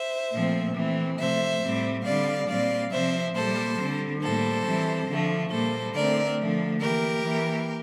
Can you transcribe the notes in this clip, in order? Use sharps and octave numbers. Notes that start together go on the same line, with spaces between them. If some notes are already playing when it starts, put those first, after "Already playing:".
Already playing: C5 E5
A#2 F3 A3 C4
E3 A3 C4
C3 F3 A3 C5 E5
A2 G3 C4
D3 G3 C4 D5 F5
A#2 G3 C4 D5 F5
C3 F3 C4 C5 E5
A#2 G3 A#3 A4 C5
D3 G3 C4
A2 G3 A#3 A4 C5
E3 G3 C4
D3 F3 A3
A#2 G3 A#3 A4 C5
D3 A3 C4 A#4 D5
D3 F3 A3
E3 A#3 G4 A#4
E3 A#3